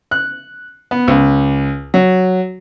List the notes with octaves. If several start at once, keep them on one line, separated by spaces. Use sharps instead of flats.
F#6
B3
C#2
F#3